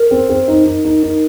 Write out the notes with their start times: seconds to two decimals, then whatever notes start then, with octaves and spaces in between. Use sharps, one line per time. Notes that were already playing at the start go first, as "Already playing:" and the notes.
Already playing: A#4
0.11 C4
0.29 C4
0.48 D#4
0.66 D#4
0.85 D#4
1.03 D#4